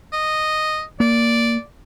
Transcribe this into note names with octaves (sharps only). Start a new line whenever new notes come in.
D#5
A#3 D5